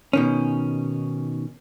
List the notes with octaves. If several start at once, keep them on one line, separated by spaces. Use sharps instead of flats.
B2 D#3 C#4